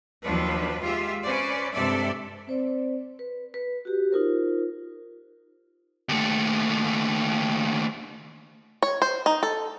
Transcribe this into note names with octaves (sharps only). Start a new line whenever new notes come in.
D#2 F3 F#3 D4 B4
G#3 F4 G4 E5
C#4 B4 C5 D5
G2 C3 G#3 A4 D5 E5
C4 C5 D5
B4
B4
F#4 G4
D#4 F4 A#4 C5
D#2 A3
C#5
C5
D#4
A4